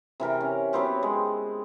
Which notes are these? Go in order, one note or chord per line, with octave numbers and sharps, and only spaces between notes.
C3 E3 A#4 G5
C#4
F#3 B3 C4 G4
G#3